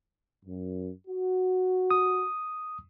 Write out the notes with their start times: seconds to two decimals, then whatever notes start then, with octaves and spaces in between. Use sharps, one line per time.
0.46 F#2
1.08 F#4
1.91 D#6